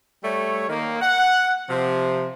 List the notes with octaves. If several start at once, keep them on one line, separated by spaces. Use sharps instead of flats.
G3 A3 C#5
D#3 A#3
F#5
C3 F3